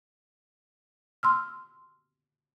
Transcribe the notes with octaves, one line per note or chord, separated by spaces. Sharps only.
C6 E6 F6